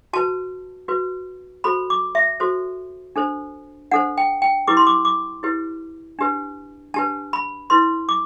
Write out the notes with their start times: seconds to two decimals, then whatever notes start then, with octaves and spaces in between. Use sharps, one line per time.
0.13 F#4 B4 A5
0.88 F#4 B4
1.64 F#4 A4 C5 B5
1.90 D6
2.15 E5
2.40 F#4 A4 C5
3.16 D4 A4 C5
3.91 D4 A4 C5 F#5
4.18 G5
4.42 G5
4.68 E4 G4 B4 D6
4.77 C6
4.87 D6
5.05 D6
5.43 E4 G4 B4
6.19 D4 G4 B4
6.94 D4 G4 B4 A5
7.33 B5
7.70 E4 B4 C6
8.09 D6